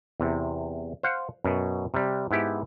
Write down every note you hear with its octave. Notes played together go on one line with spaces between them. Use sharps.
E2 C3
C5 F5 F#5
F#2 B2
C3 G3
G#2 B3 E4 G4